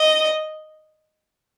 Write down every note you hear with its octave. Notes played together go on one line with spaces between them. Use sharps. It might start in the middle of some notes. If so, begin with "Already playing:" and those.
Already playing: D#5